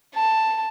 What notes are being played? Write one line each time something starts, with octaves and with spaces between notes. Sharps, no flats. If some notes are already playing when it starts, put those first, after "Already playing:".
A5